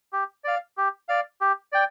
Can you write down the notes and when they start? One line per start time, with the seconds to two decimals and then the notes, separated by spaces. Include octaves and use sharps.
0.13 G4
0.44 D5 F5
0.77 G4
1.08 D5 F5
1.41 G4
1.72 D5 G5